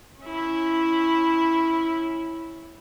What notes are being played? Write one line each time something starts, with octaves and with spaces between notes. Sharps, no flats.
C#4 E4